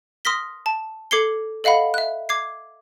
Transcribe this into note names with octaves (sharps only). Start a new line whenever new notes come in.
C6 D#6 F6 A#6 B6 G7
A5
A4 D6 G#6 C7 C#7 G7
A4 D#5 F5 F#5 B5
E5 F#6
D6 G#6 C7